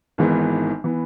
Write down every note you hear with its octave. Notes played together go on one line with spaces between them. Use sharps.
G#1 G#2 E3 B3
E3 B3